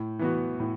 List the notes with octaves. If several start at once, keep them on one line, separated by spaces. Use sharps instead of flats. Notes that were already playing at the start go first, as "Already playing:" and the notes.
Already playing: A2
E3 B3 F#4
A2